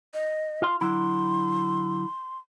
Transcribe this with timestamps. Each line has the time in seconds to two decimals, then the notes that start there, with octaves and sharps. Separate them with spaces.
0.14 D#5
0.62 F4 F5 C6
0.81 D3 F#3 E4 C6